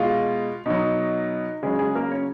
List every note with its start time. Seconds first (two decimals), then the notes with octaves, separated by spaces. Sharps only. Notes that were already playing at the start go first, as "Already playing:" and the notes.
Already playing: B2 G#3 F4
0.66 B2 F#3 D#4
1.63 C#3 F#3 G#3 G#4
1.79 G#3 G#4
1.95 A#3 A#4
2.11 C#4 C#5